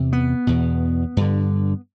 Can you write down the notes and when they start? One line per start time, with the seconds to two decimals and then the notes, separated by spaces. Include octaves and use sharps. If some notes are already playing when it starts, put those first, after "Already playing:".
Already playing: E2 C3
0.13 B3
0.47 E2 B2
1.17 G2 D3